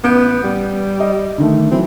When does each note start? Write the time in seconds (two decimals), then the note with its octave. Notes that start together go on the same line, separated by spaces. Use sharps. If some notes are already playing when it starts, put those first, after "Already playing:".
0.04 A1 B3 G6 D7
0.44 G3
1.00 D#5
1.38 D3 D#3 A3
1.71 E3 F#3 C4